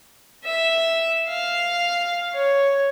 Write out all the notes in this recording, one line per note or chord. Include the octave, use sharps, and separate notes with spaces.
E5
F5
C#5